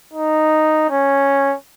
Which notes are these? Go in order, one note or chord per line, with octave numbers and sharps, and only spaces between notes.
D#4
C#4